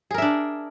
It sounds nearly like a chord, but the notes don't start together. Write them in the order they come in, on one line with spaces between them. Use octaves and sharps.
G#4 A#4 E5 D4